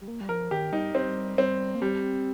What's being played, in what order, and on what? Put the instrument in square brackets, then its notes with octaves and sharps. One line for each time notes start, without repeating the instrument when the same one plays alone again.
[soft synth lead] G3
A#3
G3
[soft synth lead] F3 [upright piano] A#4
[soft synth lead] D#3 [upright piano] G4
[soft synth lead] G3 [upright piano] D#4
[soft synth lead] G3 [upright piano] C4
[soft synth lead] G3 [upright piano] C4
[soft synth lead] A#3
[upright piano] G3 [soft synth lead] C4